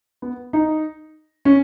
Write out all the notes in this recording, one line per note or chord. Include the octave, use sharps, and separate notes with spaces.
B3
D#4
C#4